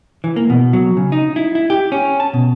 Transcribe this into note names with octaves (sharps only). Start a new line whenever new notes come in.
E3
A#3
B2
F#3
C#3
D#4
E4
E4
G4
C#4
A5
B2